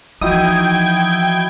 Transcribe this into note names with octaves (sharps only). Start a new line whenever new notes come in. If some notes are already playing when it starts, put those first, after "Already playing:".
E3 F3 D#4 E4 F#4 G5 D#6 G#6